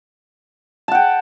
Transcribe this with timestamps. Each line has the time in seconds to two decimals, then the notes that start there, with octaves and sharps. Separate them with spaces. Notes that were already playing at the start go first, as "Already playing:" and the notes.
0.88 A5
0.91 F#5
0.95 G5